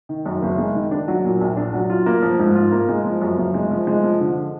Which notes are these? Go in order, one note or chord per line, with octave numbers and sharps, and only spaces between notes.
D#3
F#2
F#1
G#3
D#3
D4
F#3
A#2
A#1
D4
F#3
F4
A#3
F3
G#2
F4
A#3
G#3
F3
F#2
F#1
G#3
F3
G#3
F3
D3